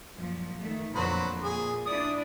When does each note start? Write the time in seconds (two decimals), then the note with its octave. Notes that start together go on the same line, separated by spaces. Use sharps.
0.15 F#2 A#2 F3
0.59 D#3 A3
0.95 F2 A#2 D3 F#3 B4 C5
1.43 A#2 G#4
1.86 D4 E4 D5 D#6